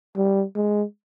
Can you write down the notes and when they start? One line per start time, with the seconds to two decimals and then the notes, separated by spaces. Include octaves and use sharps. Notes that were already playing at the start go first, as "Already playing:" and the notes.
0.16 G3
0.55 G#3